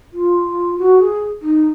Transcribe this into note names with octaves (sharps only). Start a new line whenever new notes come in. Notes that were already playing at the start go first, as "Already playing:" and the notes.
F4
F#4
G#4
D#4